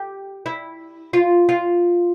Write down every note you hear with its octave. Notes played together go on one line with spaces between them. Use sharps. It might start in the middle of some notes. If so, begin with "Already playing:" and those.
Already playing: G4
E4
F4
F4